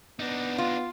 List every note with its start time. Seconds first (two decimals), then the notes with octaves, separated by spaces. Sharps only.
0.20 B3 D4 D#4
0.58 F4